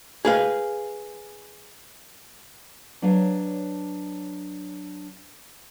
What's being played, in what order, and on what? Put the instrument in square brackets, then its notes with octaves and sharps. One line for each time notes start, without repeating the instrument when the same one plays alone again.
[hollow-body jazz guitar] G#4 B4 F5
[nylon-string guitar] F#3 D4 B4 C#5 F5